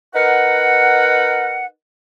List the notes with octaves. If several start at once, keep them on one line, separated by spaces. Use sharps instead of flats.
D#4 A#4 B4 F#5